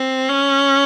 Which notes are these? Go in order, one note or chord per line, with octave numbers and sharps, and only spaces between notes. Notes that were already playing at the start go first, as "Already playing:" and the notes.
Already playing: C4
C#4